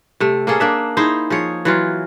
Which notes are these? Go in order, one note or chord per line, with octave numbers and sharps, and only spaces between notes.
C3 A3
A#3 C#4 G#4 A4
A#3 D4 E5
D#4 E4 G#4 C5
F3 G#4 C#5
E3 F#3 F4